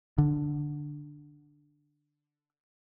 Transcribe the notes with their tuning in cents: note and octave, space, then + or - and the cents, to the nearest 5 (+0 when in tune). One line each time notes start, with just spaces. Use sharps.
D3 +5